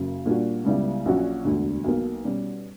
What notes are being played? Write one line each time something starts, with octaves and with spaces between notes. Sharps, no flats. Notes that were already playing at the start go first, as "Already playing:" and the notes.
Already playing: F#1 F#2 C#3 F#3
A#2 G3 A#3 D4 F#4
C#2 C#3 G3 B3 E4
A#1 A#2 F#3 C#4 F#4
E1 D2 D3
B1 B2 A#3
B2 G3 C#4